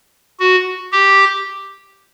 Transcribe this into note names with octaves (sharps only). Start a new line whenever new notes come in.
F#4
G4